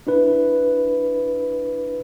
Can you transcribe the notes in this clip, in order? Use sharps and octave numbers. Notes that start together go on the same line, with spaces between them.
D4 E4 B4